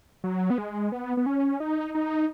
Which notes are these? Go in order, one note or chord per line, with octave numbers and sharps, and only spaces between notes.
F#3
B3
G#3
B3
B3
C#4
D#4
D#4